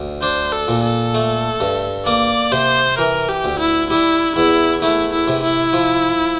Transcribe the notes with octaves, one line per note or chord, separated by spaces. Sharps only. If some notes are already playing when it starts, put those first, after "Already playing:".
Already playing: D2
D4 C5
A4
A#2
A4
A3
G2
A#3 D5
C3 C5
E3 A#4
G4
D2
E4
G3 E4
E2 E4
A3 E4
E4
C3
E4
F3